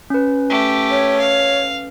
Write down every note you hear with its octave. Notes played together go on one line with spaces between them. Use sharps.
C#4 B4
A3 G4
C#5
F5